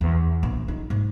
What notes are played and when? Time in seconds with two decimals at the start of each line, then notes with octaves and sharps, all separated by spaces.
0.01 E2
0.43 A#1
0.68 D#4
0.90 G#2